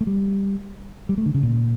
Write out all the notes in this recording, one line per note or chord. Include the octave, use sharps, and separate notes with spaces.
A3
G3
G3
A3
D3
C#3
A#2